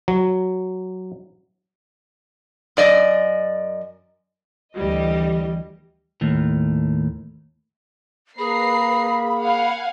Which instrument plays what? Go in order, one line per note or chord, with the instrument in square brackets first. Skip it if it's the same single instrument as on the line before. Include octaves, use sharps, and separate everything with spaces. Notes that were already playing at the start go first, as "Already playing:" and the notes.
[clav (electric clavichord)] F#3
[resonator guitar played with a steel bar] F#2 D5 D#5
[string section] D2 E3 G3 D#5
[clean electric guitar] D#2 A2
[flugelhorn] A#3 [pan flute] G#4 [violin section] B4 A#5 C7 [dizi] B5
[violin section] F5 F#5 G#5